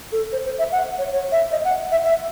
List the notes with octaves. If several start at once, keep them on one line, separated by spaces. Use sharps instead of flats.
A4
C5
C5
E5
F#5
C#5
C#5
E5
D#5
F#5
E5
E5